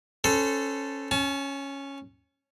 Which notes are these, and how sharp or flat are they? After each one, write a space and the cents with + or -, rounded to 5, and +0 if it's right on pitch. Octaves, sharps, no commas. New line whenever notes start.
C#4 -10 A4 +0 C5 -30
C#4 -5 A5 -45